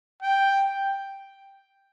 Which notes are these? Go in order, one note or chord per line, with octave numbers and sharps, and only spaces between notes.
G5